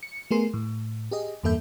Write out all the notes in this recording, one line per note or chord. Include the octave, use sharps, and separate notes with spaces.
C#7
A3 B3 G#4 A#4 C6 C7
A2
G4 G#4 D#5
E2 G2 A#3 A4 E5 G6